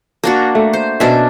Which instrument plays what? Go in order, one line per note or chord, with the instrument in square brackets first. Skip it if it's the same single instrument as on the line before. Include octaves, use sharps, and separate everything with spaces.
[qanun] A#3 D4 F#4
[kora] A3
[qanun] C5
[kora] B2 C5 E5 [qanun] C#4 D4